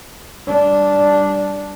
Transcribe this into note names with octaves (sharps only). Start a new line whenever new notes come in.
G3 D4